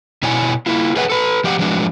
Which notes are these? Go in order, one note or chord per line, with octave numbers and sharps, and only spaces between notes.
B2 E4 C#5 D5 G#5
A#3 E4 F4
G#4 B4 C#5 E5 F#5
A4 B4
F3 G4 D5 F5 F#5
F3 F#3 G#3 D4 F4 F#4